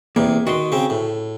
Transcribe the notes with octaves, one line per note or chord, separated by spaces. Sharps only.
E2 C3 A#3
D#3 F#4 C6
C#3 C4
A2